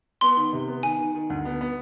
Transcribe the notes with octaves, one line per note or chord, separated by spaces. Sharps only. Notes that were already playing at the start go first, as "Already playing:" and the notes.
B3 C6
D#3
C3
B3
D#3 G#5
D#3
D#3
D2
B3
B3